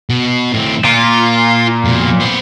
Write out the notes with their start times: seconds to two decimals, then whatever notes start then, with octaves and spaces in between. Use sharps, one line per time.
0.10 B2 B3
0.53 A2 C4
0.85 A#2 F4
1.85 F2 B2
2.20 B3 C5